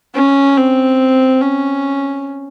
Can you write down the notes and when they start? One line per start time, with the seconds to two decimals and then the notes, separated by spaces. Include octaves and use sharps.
0.15 C#4
0.57 C4
1.42 C#4